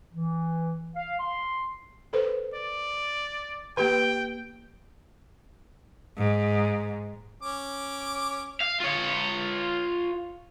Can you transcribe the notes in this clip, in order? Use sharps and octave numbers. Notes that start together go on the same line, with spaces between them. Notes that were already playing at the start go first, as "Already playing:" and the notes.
E3
F5
C6
A4 B4 C5
D5
A#3 G4 B4 G5
G#2
C#4 D6
F5
F4 C#5